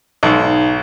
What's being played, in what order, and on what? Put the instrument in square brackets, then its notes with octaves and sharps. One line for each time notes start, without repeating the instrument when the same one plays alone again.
[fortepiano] B1 G#2